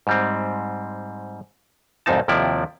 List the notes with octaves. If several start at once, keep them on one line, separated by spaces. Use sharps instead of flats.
G#2 G3 C4
C2 F2 G#2 C4 D#4 A5
D#2 C3 F3 E4 D5